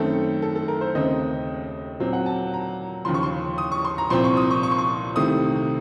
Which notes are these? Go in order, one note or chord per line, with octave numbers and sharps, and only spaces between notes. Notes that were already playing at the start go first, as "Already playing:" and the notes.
Already playing: F#2 D#3 A3 C4 A4
A4
A4
A#4
C5
D#2 C#3 A3 C4 D#5
A#2 F#3 C4
F#5
A5
A#5
D#2 C#3 F3 C6
C#6
C6
D#6
C#6
C6
A#5
C2 A#2 F3 C4 C6
C#6
D#6
C#6
C#6
C6
C#6
C2 C3 D#3 A3 C4 D#6